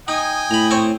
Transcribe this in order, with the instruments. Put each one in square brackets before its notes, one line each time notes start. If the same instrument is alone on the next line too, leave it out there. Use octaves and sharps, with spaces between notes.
[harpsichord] D#4 [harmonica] G5 G#5 D#6
[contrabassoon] A2 [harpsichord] A#5 B5
[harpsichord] C4 C5 C#5